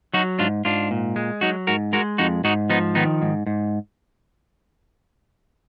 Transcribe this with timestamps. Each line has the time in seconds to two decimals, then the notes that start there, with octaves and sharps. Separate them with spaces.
0.14 F#3 D#4 F#4
0.39 G#2 D4 F4
0.65 G#2 D4 F4
0.91 A#2
1.16 G#3
1.41 F#3 D#4 F#4
1.67 G#2 F#4 A#4
1.93 G#3 F#4 A#4
2.18 F2 D#4 F#4
2.44 G#2 D#4 F#4
2.70 F3 B3 D#4
2.95 D#3 B3 D#4
3.22 G#2
3.46 G#2